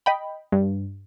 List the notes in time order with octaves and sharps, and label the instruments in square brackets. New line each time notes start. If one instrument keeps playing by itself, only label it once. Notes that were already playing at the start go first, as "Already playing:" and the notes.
[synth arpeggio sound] D#5 G5 B5
G2